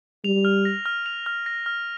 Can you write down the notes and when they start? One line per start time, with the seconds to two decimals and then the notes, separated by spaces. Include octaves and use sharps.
0.24 G3 F7
0.45 F6
0.65 A#6
0.86 F6
1.06 F7
1.26 F6
1.46 A#6
1.66 F6